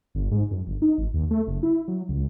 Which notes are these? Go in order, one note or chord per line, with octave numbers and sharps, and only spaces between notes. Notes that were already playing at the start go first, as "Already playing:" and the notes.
G1
G#2
F#2
G1
D#4
G#1
D#2
A3
F#1
E4
F#3
C#2